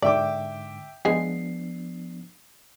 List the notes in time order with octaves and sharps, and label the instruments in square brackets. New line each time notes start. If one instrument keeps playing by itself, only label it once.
[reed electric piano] G#2 D3 [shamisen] D5 [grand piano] E5 G5 D6
[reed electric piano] F3 B3 D4 [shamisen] G#3 G#4 [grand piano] C7